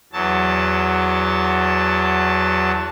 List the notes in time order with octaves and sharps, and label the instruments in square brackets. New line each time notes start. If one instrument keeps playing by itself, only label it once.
[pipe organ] E2 F#3 A5